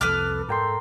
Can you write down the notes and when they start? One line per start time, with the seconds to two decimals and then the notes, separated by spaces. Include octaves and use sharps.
0.01 C2 F2 F3 A4 B4 D6 F6
0.48 G#2 A4 A#4 G5 C6